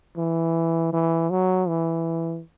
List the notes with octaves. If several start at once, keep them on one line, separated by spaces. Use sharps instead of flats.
E3
E3
F#3
E3